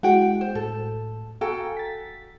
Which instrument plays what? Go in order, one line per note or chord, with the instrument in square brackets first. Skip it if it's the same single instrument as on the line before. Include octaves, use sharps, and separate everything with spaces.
[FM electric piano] G#3 E4 F#4 [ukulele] F#5 G5
[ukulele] C5
[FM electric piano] A2 [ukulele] A4
[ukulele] F#4 A4 G5 [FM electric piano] F5 G#5 A#5
[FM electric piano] A6 B6